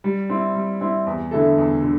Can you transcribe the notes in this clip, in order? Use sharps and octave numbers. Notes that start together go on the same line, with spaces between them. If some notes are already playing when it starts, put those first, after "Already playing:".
G3
C4 E4
G3
C4 E4
E2
D3 A3 E4 A4
E2
D3